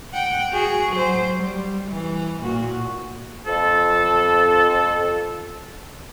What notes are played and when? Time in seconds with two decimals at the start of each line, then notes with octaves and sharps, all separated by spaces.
0.14 F#5 G5
0.53 F#4 G#4
0.93 F#3 C5
1.35 G3
1.91 E3
2.42 A#2 F#4
3.46 F2 A4